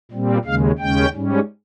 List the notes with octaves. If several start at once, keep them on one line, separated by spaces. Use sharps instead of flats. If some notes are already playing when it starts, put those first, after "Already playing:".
A#2 G3 C4
D#2 C#3 G#3 F5
D#2 C#3 G#3 C#4 G5
G#2 G3 C#4